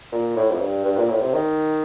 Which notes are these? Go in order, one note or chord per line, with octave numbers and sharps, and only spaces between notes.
A#2
A2
F2
G2
G2
A#2
A2
C3
D#3